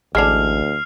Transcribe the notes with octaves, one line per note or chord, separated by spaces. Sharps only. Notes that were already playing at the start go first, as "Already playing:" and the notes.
A1 D2 G#3 D4 F6 C7 F7